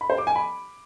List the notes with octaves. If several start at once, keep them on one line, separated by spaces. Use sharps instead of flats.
B5
C5
D6
G#5
B5